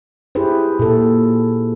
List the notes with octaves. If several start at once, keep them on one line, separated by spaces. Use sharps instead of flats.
E4 G4 G#4 B4 C5
A#2 A4